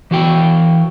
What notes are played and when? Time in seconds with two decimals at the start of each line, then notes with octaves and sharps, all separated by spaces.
0.11 E3 F#4 G5